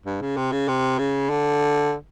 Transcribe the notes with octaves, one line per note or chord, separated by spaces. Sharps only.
G2
C#3
C3
C#3
C3
C#3
D3